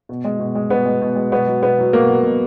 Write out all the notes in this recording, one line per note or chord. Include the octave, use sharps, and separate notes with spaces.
B2
G#3
B2
G#3
B2 B3
G#3
B2
G#3
B2 B3
F#3
B2 B3
F#3
B2 A#3
F#3
B2